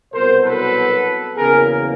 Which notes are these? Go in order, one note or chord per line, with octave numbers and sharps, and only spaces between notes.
C2 B2 F#3 B3 A#4 C5
A4 B4
E2 C#3 F#3 A#3 G#4 A#4